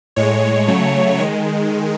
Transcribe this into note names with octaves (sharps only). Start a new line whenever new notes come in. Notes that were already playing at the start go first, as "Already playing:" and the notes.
A2 G#3 C#5
C#3 F#3 A3
D#3 G#3